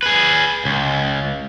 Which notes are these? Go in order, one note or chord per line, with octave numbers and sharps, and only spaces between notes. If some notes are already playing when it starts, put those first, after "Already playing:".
G#4 B4
C#2